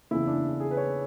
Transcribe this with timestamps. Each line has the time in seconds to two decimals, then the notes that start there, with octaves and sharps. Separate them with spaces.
0.11 F#1 E2 C#3 E3 E4
0.27 D4
0.60 G#4
0.71 B4
0.77 C#5